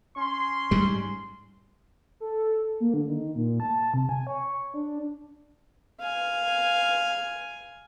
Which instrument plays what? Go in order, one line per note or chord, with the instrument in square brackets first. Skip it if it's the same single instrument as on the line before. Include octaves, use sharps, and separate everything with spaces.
[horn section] C#4 C6
[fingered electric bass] G#2 G3
[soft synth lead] A4
A#3
D3
D#3
A#2
A5
C3
G#5
C#5
D4
[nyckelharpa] F5 G#5